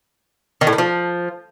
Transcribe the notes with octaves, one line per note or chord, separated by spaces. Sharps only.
D#3
A2
D#3
F3